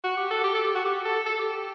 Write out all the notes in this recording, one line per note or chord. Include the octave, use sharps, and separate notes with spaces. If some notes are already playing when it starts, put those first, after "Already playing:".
F#4
G4
A4
G4
A4
G4
F#4
G4
A4
A4
G4
G4